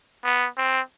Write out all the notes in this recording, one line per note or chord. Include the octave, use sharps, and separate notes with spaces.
B3
C4